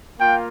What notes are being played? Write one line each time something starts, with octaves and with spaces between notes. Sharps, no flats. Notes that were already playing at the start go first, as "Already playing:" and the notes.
A#3 F4 G5